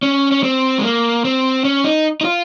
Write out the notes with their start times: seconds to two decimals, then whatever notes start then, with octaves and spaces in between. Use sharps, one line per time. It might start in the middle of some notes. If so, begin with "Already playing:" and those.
0.03 C#4
0.32 C#4
0.43 C4
0.78 G#3
0.83 A#3
1.25 C4
1.65 C#4
1.84 D#4
2.21 D#4
2.25 F4